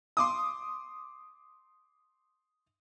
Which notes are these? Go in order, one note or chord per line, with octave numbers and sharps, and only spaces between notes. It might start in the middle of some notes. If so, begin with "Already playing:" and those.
C6 D6 D#6